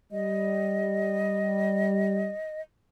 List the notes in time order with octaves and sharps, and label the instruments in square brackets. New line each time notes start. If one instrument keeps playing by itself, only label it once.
[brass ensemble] G3 [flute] D#5